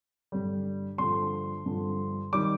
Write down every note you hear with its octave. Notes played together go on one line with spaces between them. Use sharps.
G2 D3 G3
G2 D3 F3 C6
G2 D3 F3
D#3 G3 D6